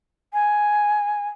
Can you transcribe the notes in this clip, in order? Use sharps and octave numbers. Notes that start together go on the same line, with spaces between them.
G#5